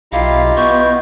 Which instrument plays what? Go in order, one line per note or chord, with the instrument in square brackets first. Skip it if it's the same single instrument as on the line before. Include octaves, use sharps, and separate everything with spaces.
[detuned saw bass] B1 [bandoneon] E4 F4 G4 [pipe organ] D#5 A#5 [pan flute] F5
[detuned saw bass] B3 [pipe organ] D#5 G6 [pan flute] C#6